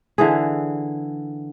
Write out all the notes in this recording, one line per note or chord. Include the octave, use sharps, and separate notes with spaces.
D3 E3 G#4